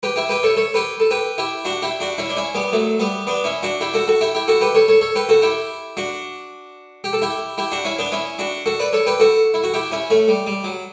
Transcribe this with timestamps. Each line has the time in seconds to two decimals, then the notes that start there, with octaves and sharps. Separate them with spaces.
0.03 G4 B4
0.16 E4 G4
0.29 G4 B4
0.43 A4 C#5
0.57 A4 C#5
0.74 G4 B4
1.00 A4
1.11 G4 B4
1.38 E4 G4
1.65 D4 F#4
1.82 E4 G4
2.00 D4 F#4
2.18 C#4 E4
2.29 D4
2.37 C#4 E4
2.55 G3 B3
2.73 F#3 A3
3.00 G3 B3
3.27 B3 D4
3.44 C#4 E4
3.63 D4 F#4
3.81 E4 G4
3.94 F#4 A4
4.07 F#4 A4
4.21 E4 G4
4.35 E4 G4
4.48 F#4 A4
4.61 G4 B4
4.75 A4 C#5
4.88 A4 C#5
5.01 A4 C#5
5.16 G4 B4
5.29 F#4 A4
5.42 E4 G4
5.97 D4 F#4
7.04 G4
7.13 A4
7.22 E4 G4
7.58 E4 G4
7.72 D4 F#4
7.85 C#4 E4
7.99 B3 D4
8.12 C#4 E4
8.39 D4 F#4
8.66 F#4 A4
8.80 B4 D5
8.93 A4 C#5
9.06 G4 B4
9.20 F#4 A4
9.54 E4
9.64 F#4
9.74 E4 G4
9.91 C#4 E4
10.10 A3 C#4
10.28 G3
10.47 G3
10.64 F#3